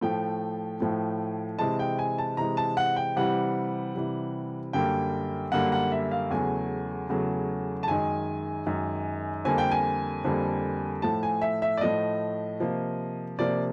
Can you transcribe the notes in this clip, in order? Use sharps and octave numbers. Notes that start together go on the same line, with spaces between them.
A2 F3 A3 G5
A2 F3 A3
C3 E3 G#3 A5
G5
G#5
A5
C3 E3 G#3 A#5
A5
F#5
G5
C3 E3 G3 F#5
C3 E3 G3
F#2 D3 G3 A#3 G5
F#2 D3 G3 A#3 F#5
F#5
E5
F5
E2 C#3 F#3 A3 G#5
E2 C#3 F#3 A3
A5
F#2 D#3 G#3 G#5
F#2 D#3 G#3
F2 D3 G3 A#3 G#5
G5
G#5
F2 D3 G3 A#3
A2 F3 A3 A5
G#5
E5
E5
D5
A2 F3 A3 D#5
C3 F3 A#3
C3 F3 A#3 D5